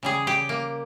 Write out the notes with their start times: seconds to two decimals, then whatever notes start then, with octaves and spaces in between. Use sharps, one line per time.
0.03 C#3 G3 G#4
0.27 G4
0.49 A#3